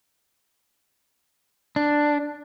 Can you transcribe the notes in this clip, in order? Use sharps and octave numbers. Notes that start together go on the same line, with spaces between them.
D4